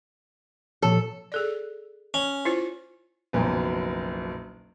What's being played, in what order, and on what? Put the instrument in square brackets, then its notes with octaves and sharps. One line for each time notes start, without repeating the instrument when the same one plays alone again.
[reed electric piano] A#2 F3 C#5 [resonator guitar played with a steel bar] A4
[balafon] G#4 A4 D5
[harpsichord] C#4
[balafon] E4 F4 C5
[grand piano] F#1 B1 F3 F#3